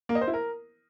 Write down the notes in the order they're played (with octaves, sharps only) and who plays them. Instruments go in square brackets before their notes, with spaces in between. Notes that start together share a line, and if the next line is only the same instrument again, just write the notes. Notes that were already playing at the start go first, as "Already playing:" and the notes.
[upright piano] A#3
D#5
C5
E4
A#4